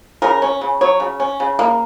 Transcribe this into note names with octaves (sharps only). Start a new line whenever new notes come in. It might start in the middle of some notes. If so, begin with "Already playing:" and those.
C#3 A#4
C#4
C#3
F#3 C#5
C#3
C#4
C#3
A#3